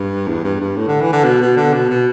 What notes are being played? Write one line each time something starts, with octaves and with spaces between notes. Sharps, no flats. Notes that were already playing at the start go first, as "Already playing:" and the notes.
Already playing: G2
E2
G2
G2
A2
D3
E3
D3
B2
B2
D3
B2
B2